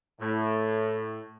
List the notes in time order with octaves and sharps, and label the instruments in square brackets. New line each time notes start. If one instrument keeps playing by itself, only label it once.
[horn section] A2